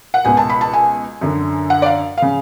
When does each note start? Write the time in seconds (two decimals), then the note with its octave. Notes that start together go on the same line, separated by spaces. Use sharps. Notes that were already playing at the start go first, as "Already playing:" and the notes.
0.14 F#5
0.25 C#2 B2 G#5
0.37 A5
0.50 B5
0.61 A5
0.73 G#5
1.21 F#2 D3
1.70 F#5
1.82 D5
1.86 F5
2.18 C#3 F5